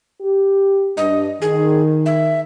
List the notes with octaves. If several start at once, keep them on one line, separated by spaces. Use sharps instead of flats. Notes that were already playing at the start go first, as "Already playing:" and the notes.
G4
G2 D#5
D#3 G#4
E5